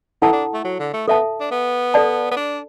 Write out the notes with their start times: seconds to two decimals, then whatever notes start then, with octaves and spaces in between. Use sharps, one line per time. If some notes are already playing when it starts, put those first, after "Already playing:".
0.22 E3 E4 A4 F#5 A5
0.33 D4
0.54 A3
0.65 F#3
0.79 D3
0.93 A3
1.08 B3 A4 E5 A5
1.40 D4
1.51 B3
1.94 A4 D5 A5
2.32 B3
2.36 D4